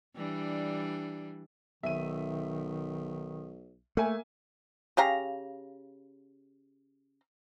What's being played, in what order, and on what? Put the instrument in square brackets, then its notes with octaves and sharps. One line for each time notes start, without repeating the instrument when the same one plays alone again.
[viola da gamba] E3 G3 D4
[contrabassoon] B1 [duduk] D#3 [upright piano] E5 D#7
[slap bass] A3 [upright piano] A#3 E5 G#5
[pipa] C#3 G4 F5 A#5